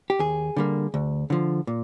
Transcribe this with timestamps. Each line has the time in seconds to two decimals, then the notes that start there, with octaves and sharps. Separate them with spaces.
0.10 G4
0.19 D#2 G#4
0.57 D3 G3 A#3
0.94 D2
1.30 D3 F3
1.67 A#2